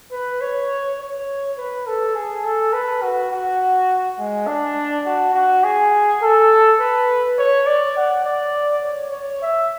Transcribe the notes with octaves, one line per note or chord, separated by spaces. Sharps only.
B4
C#5
C#5
B4
A4
G#4
A4
B4
F#4
F#4
G#3
D4
F#4
F#4
G#4
A4
B4
C#5
D5
F#5
D5
C#5
C#5
E5